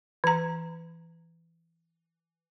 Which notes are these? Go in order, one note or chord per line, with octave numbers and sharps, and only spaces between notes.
E3 A#5